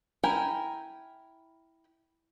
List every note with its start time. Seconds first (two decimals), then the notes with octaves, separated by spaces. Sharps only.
0.23 E4 A#4 G5 G#5